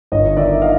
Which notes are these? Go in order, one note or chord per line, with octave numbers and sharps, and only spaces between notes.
G1 C#5 D#5
D#3 D5 E5
D#5 F5